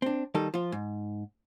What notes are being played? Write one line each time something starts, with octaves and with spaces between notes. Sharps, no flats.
C4 D4
D#3 G3 D#4 A4
F3 F4
G#2